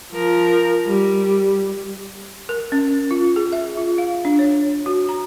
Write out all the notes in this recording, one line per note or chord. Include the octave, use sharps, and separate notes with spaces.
F3 A#4
G3
A#4
C#4
F4
G#4
E5
F4
F5
D4
C#5
F#4
A#5